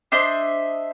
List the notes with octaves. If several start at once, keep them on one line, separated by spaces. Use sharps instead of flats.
D4 C5 D#5 E5